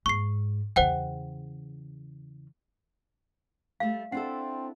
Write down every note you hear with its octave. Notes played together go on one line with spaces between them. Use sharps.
G#2 C#6 C7
E2 C#3 C5 F#5 G5
G3 A3 F5
C4 D4 E4 A4 F#5